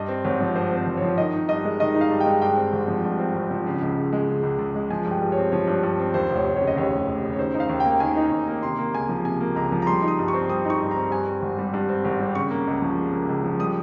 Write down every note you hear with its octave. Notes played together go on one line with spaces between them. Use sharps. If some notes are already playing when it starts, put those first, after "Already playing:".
Already playing: G2 D#5
C4
G#1 C#5
F3
G2 C5
C4
C5
G#1
F3 C#5
D#3 D#5
D#4
G2 D#5
G#3
D#3 D#5
D#4
F5
G2
G5
G#3
G2 G5
C4
G#1
F3
G2
C4
G#1
F3
C#3
C#2
C#2
G#3
C#3
C#2
C#2
G#3
F3 G#5
G2
G5
G2
C#5
C4
F3 C#5
G2
G2
C4
D#2 C5
F1
C#5
F1
C#3 C#5
D#5
D#2 C#5
F1
F1
C#3
C#5
D#3 C5
D#4
F5
D#2
A#3 G5
D#3 G#5
D#4
D#2
A#3
C3 C6
A#3
C#2 G#5
F3
C3 G#5
A#3
C#2 A#5
F3
A#5
G3 C6
D#4
D#6
G2
C#6
C4
G3 D#6
D#4 C#6
G2
A#5
C4
G2 G#5
C4
G#1
G3
G2
C4
G#1
G3
C#3 C#6
A#3
C#2
F3
C#3
A#3
C#2
F3
G3 D#6